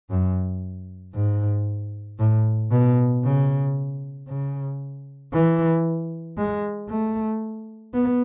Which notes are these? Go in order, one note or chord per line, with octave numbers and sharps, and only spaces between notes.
F#2
G#2
A2
B2
C#3
C#3
E3
G#3
A3
B3